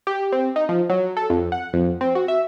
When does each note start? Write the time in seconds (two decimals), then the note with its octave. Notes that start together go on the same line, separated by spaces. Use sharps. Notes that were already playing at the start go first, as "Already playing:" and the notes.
0.07 G4
0.32 C4
0.56 D#4
0.69 F3
0.90 F#3
1.17 A4
1.30 F2
1.52 F#5
1.73 F2
2.01 C4
2.15 F#4
2.28 E5